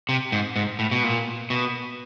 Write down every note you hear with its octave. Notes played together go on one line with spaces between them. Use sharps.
C3
G#2
G#2
A2
B2
A#2
B2